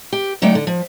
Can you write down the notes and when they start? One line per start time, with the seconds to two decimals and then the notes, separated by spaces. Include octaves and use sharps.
0.13 G4
0.42 D3 F#3 A3 D#4 D5 G5
0.55 D3
0.67 F3